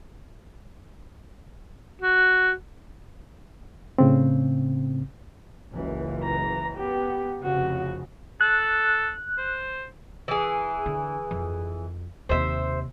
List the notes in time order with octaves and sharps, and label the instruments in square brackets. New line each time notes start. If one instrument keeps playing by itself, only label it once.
[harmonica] F#4
[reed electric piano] A2 C#3 C4
[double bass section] F#1 C#2 E3
[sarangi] A#5
[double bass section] B3 [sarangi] G4
[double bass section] F1 C#3 [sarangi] F#4
[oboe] A4 [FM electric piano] F#6
[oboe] C5
[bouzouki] E3 G#4
[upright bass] D3
F2
[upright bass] D#2 C3 [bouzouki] C5 E5